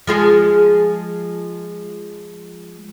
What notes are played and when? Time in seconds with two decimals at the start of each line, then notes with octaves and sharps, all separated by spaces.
0.07 F3 G#3 G#4